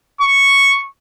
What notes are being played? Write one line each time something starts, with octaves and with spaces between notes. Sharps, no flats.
C#6